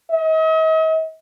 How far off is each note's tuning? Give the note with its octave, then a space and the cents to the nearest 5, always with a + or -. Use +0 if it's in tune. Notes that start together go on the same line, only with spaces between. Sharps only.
D#5 +45